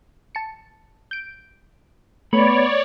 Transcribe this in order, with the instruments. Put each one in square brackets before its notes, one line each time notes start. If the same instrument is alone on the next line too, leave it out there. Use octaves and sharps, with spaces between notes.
[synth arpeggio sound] A5 C#7
G6 D7
[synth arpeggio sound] A3 [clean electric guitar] B3 B5 [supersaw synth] C#5 D5